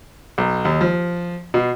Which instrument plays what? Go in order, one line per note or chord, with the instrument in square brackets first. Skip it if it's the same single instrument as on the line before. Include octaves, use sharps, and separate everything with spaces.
[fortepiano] B1
D#2
F3
B2